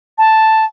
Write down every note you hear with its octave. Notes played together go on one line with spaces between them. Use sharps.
A5